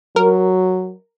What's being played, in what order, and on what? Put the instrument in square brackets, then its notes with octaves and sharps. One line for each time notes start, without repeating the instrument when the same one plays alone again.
[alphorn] F#3 [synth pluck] A#4